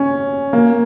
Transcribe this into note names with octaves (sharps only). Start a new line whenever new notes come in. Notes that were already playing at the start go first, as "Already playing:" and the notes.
Already playing: C#4
A#3